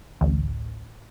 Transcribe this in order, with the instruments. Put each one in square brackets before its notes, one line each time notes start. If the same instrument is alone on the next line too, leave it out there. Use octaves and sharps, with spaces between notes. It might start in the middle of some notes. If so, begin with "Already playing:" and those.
[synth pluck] A1 D2